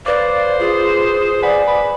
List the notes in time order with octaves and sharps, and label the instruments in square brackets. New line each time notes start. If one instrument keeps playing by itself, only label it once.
[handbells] B4 D6 [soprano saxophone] C5 [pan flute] D5 [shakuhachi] F5
[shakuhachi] F4 [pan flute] G#4
[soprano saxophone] B4 [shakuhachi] D5 [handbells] F#5 G#5
[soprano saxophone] B4 [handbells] B5